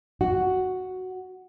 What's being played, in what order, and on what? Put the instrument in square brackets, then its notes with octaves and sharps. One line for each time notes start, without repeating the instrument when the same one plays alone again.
[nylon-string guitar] F#4